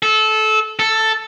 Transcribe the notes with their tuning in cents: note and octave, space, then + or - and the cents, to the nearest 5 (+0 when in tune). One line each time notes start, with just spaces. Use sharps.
A4 -20
A4 +5